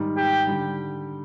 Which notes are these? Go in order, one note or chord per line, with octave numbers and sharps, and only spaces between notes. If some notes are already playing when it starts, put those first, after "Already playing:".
Already playing: G#2 D#3 G3
G4
D3 G3